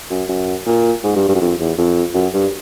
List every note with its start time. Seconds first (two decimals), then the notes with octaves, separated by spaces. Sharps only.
0.11 F#2
0.29 F#2
0.66 A#2
1.03 G#2
1.16 G2
1.29 G2
1.35 F#2
1.41 F2
1.60 E2
1.78 F2
2.14 F#2
2.34 G2